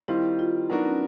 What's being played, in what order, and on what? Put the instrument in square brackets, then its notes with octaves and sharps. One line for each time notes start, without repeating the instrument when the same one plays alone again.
[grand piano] D#3 G3 C4 F4 [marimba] E4
[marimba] F4
[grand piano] F#3 B3 D4 F#4 A#4 [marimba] D#4
[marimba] C#4